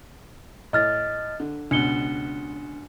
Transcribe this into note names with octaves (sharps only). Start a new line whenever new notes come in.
A2 D#5 F6 A6
D3
C#2 B2 D4 C#7 G7